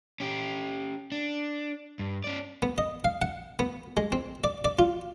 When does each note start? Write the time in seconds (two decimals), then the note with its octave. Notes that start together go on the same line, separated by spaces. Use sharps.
0.20 C#4 G4
1.12 D4
1.99 G2
2.24 C#4 D5
2.62 B3
2.78 D#5
3.04 F5
3.22 F#5
3.59 B3
3.97 G#3
4.12 C4
4.44 D5
4.65 D5
4.79 F4